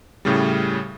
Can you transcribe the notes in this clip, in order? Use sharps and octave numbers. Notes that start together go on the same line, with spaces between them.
A2 C#3 G3